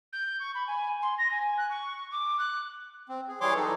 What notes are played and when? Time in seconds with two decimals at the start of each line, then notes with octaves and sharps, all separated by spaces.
0.12 G6
0.40 C#6
0.54 B5
0.67 G#5
1.02 C6
1.18 A#6
1.31 G#5
1.57 F#6
1.69 C#6
2.11 D6
2.39 F#6
3.09 C4
3.28 G#4
3.41 E3 G3 G#4 C#5 C6 D6
3.56 E3 F#3 G3 D#4 A4